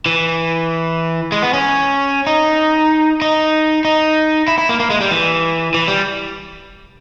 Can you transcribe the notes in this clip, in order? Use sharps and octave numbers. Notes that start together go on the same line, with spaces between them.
E3
G#3
B3
C#4
D#4
D#4
D#4
E4
E4
A#3
A#3
G#3
G3
E3
E3
G3